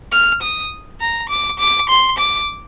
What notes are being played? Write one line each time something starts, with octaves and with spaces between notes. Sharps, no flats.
F6
D#6
A#5
D6
D6
C6
D6